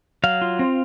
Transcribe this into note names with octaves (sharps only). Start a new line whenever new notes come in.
F#3 F5
F4
C4